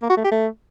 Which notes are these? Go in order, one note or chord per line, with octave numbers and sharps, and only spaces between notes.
A#3
F#4
A3
G4
A3